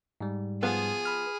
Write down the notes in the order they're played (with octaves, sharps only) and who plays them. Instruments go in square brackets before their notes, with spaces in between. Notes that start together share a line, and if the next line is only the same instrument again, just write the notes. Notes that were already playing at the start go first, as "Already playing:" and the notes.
[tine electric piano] G#2 G3
[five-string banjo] F3 B3 F4 [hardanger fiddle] G#4
[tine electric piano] B5 F6